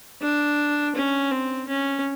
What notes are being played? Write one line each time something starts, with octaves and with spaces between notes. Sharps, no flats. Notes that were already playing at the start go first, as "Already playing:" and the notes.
D4
C#4
C4
C#4